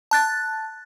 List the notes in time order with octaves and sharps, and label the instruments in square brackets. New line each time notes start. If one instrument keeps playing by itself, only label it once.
[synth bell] A5 F#6 A6